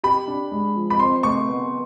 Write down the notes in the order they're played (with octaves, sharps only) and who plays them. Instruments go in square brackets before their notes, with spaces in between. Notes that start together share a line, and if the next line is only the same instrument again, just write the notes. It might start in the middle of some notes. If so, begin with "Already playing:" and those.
[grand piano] G4 [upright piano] B5
[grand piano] D4
G#3
F3
[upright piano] B5
[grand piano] C4 [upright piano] C6
[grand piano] A3 [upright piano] C#6
[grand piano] B3